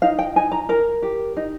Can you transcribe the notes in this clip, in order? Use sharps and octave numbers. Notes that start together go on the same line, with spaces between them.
D#4 F5
G5
D#4 G#5
A#5
A#4 A#5
G4
D#4